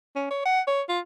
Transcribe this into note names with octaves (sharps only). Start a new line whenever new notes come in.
C#4
C#5
F#5
C#5
F4